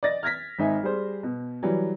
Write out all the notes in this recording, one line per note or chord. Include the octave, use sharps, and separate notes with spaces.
D5 D#5 A6 A#6
F6 G#6 A#6 B6
G#1 D#4 E5 G#5
G3 G#4 C5
B2
E3 F#3 G3